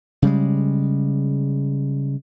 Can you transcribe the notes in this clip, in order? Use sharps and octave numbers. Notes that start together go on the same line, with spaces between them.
C#3 G3 G#3